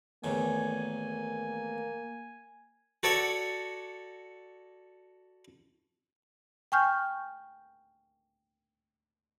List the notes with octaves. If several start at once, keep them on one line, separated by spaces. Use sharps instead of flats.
E2 A2 D#3 A#3 G#5
F#4 A4 C#5 D5 C#6
G5 G#5 C#6 F6 G6